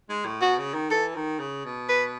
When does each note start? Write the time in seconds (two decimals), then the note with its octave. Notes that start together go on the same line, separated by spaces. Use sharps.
0.09 G#3
0.25 A2
0.42 B2 F#4
0.58 C#3
0.74 D#3
0.91 E3 A4
1.15 D#3
1.39 C#3
1.65 B2
1.89 B4